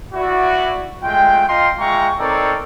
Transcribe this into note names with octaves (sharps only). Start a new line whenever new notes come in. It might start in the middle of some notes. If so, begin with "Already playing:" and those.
E4 F#4 D5
G#3 A3 F4 G5
F4 D#5 F5 G5 A#5 C6
G#3 F4 E5 G5 A#5 C#6
C4 D#4 A4 A#4 C#5 D5